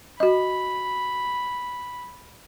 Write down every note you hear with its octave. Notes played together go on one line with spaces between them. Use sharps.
F#4 D#5 B5